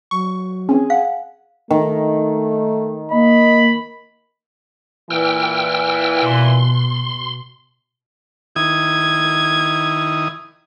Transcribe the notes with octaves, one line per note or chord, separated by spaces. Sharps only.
F#3 C#6
E3 C4 C#4 G#4
F5 F#5
D#3 A3
A#3 D#5 B5
A#2 E3 G5 E6 F6
B2 C6
D#3 E4 D#6 G#6